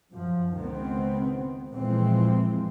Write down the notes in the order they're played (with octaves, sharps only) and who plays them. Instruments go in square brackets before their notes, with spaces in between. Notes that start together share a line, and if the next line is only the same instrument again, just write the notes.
[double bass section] F#2 F3
C#2 D#3 B3 C4
F2 A#2 E3 F3 G#3 C4